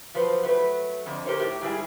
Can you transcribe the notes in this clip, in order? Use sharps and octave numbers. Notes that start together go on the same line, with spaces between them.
F3 F#3 B4 C5
F#3 A3 B4
F2 D3
G4 A#4 C5 C#5
A2 G4
G#2 G3 E4 G#4